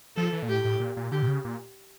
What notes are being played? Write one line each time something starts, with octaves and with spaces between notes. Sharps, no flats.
F3 A4
E3
A#2
A2 G4
A2
A#2
A#2
D3 G4
A#2
C#3
A#2